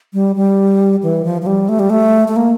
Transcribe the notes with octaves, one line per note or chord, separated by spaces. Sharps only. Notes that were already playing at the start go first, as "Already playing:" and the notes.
G3
G3
E3
F3
F3
G3
A3
G3
A3
A3
A#3